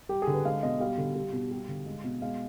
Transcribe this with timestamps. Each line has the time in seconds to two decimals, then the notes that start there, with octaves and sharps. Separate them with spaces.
0.09 G3 G4
0.22 G#4
0.27 D3
0.34 B4
0.45 G#3 F5
0.63 B2 D#5
0.80 G3 F5
0.98 D3
1.16 G3
1.33 B2
1.51 G3
1.68 D3
1.86 G#3
2.04 B2
2.22 G#3 F5